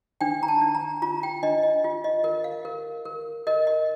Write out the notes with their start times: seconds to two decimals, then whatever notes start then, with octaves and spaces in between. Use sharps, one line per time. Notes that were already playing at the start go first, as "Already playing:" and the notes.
0.21 D4 G5
0.43 A#5
0.48 A5
0.61 D4
0.75 A#5
1.02 F4 A#5
1.23 G5
1.43 D4 D#5
1.63 D#5
1.84 F4
2.04 D#5
2.24 A#4 D#5
2.44 F5
2.65 A#4
3.05 A#4
3.47 A#4 D#5
3.67 D#5